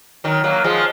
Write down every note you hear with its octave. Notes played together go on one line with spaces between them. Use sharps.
D#3 F#3
F#3 A#3
F3 G#3